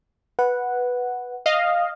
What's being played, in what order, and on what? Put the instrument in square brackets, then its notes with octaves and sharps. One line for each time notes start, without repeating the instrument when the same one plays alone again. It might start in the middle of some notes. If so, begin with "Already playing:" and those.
[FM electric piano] B4 F#5
[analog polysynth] D#5 F5